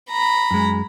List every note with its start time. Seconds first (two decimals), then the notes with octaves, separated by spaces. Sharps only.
0.10 A#5 B5
0.51 F#2 G#3